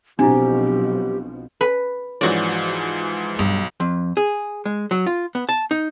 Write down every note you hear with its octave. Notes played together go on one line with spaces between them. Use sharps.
B1 B2 F3 C4 D4 E4 G4
B4
G#2 E3 F3 F#4 D5
B1 G2
F2
G#4
G#3
F#3
F4
B3
A5
D#4